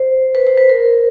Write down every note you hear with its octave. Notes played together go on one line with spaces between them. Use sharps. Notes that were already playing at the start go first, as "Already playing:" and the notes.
Already playing: C5
B4
C5
B4
A#4